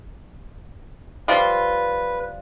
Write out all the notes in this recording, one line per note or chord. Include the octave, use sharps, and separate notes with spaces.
F3 G3 F4 B4